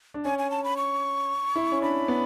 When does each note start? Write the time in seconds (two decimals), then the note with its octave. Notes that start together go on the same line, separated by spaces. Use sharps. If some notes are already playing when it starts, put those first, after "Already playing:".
0.14 D4
0.25 C#4 G#5
0.39 G#5
0.50 A5
0.64 B5
0.77 C#6
1.56 E4
1.72 C#4
1.82 D4 B5
2.08 B3